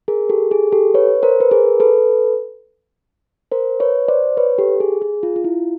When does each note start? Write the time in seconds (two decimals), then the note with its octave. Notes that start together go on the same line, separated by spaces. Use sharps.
0.08 G#4 A#4
0.29 G4 A4
0.51 G#4
0.72 G4 A4
0.94 B4 C#5
1.23 A#4 C5
1.40 B4
1.51 G#4 A#4
1.80 A4 B4
3.51 A#4 C5
3.80 B4 C#5
4.08 C5 D5
4.37 B4 C#5
4.58 G4 A4
4.80 G#4
5.02 G#4
5.23 F4
5.36 F4
5.44 E4